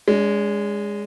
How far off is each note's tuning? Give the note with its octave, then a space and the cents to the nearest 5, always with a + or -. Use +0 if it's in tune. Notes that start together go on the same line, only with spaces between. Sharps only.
G#3 -15 C#4 +45